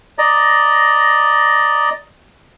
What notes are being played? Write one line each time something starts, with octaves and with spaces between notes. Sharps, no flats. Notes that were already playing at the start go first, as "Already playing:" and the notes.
D5 D#5 A#5